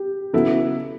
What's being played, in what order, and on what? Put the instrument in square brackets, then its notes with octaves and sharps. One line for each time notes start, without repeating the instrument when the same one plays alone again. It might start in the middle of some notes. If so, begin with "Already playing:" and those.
Already playing: [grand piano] G4
[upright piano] C#3 F#3 B3 E4 [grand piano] A4